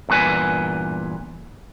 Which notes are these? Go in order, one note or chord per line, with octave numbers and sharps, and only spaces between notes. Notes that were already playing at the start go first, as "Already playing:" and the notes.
E2 G2 A#2 B4 G#5